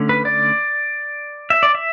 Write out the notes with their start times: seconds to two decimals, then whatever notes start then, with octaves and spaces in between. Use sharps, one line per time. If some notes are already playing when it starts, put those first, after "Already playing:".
Already playing: D3 A3 C#4
0.09 B4
0.25 D5
1.50 E5
1.63 D5
1.75 E5